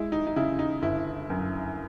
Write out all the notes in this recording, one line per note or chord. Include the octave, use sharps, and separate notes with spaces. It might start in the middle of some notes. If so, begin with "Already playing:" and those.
Already playing: G#3 E4
D#4
D#4
C#3 E4
D#4
G1 E4
F#2